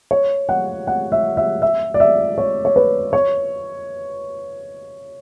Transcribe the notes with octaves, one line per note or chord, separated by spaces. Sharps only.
C#5
F#5
F#5
E5
E5
E5
D5
E5
C#5
C#5
B4
C#5